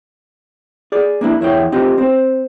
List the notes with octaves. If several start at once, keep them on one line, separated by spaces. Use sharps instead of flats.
G#4 D5
A#3 D4 E4
E2 E4 C#5 G5
C4 D#4 F4 G4
C4 C5